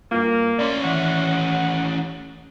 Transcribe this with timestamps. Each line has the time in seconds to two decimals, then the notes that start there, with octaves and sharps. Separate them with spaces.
0.12 G2 A#3 F4
0.58 A2 C#4 D5 B5 C6
0.84 D#2 E3 F#5